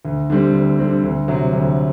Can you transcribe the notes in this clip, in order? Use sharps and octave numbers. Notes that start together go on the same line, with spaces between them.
D2
D3 G3 C4
D2
D3 G3 C4
D2
C3 F#3
D2